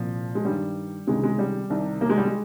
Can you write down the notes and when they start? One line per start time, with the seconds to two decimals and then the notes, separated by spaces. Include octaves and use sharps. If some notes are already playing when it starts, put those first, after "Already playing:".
Already playing: C2 A#2 F3
0.35 G#3
0.45 G2 D#3 G3
1.07 C#2 C3 D#3 G#3
1.23 G#3
1.39 G3
1.70 C2 C3 D#3
2.01 A#3
2.10 G#3
2.18 G3
2.25 G#3